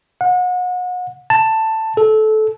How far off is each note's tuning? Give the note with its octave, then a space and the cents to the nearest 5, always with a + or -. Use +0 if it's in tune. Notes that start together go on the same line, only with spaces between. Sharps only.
F#5 -35
A5 +10
A4 -20